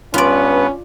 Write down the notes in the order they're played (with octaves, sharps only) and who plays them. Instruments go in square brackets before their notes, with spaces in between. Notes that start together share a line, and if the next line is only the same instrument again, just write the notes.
[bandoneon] G2 B3 B4 [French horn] C#4 [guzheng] F4 D5